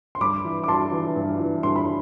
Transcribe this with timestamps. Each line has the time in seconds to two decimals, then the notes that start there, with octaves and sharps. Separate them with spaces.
0.15 C6
0.21 G2 B5 D6
0.45 E3
0.64 D6
0.68 G2 A5 C6
0.92 E3
1.16 G2
1.40 E3
1.63 G2 C6
1.76 B5